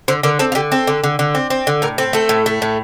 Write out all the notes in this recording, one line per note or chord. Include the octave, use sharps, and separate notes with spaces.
D3 C5
D3 A#4
C4 A4
F4
D3 G4
C4 A4
D3
D3
D3
C4
C4
D3
A2 A#4
C4 A4
A3 A4
A2
A3
A2